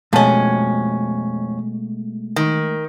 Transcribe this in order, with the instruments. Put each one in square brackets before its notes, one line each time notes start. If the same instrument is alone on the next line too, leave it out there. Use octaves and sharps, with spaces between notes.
[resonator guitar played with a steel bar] F2 C#4 [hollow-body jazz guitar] B2 A5 [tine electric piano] G#3 A3
[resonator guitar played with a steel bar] D#3